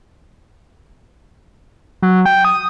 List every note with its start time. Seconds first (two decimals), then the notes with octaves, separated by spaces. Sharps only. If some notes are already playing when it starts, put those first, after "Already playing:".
2.02 F#3
2.25 G5
2.45 D#6